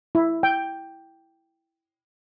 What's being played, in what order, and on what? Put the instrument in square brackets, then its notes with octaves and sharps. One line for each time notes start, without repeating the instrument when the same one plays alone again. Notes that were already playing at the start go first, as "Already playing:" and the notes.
[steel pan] E4
G5